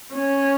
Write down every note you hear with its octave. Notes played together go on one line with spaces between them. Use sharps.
C#4